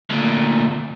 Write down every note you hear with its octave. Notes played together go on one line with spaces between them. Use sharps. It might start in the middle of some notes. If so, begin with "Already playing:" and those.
D2 A#2